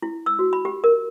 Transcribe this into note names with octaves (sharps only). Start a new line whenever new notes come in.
E4
E6
F#4
B5
G4
A#4